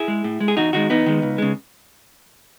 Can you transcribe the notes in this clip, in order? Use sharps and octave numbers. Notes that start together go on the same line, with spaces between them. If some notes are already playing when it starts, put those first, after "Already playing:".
Already playing: E4 G#4
G#3
A2
G#3
G#4
E2 D#4 F#4
D#3 G#3 D#4 F#4
E2 B3 D#4
D#3 G#3
C#2
C#3 G#3